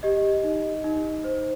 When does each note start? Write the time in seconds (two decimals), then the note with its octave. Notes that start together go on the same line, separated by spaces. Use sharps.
0.03 G4 D#5
0.43 D#4
0.84 D#4
1.24 C5